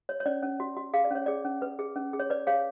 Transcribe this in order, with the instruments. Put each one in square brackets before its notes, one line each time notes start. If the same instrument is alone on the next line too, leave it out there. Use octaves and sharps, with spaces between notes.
[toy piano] C#5
C#5
C#4 D5
C#4
F#4
F#4
G#4 F5
D5
C#4 C#5
G#4 D5
C#4
B4
G#4
C#4
G#4
C#5
B4 D5
G#4 C#5 F5